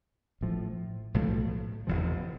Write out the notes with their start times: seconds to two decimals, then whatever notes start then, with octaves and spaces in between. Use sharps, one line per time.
0.41 A1 A2 F3
1.14 B1 A2 F3 A3
1.87 F1 E2 C3 F3